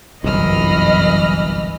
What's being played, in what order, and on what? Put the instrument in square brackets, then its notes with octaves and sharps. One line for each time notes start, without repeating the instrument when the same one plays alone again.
[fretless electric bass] G1 C2 [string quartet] F#2 B5 F6 [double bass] E3 [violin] D#5